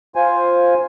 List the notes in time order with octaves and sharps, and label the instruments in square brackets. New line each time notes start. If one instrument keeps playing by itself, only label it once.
[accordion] F4 C5 G#5